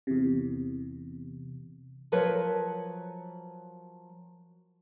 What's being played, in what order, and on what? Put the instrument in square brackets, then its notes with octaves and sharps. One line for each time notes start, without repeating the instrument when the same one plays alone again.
[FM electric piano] E2 C3
[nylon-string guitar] F3 F#3 A#4 B4 C#5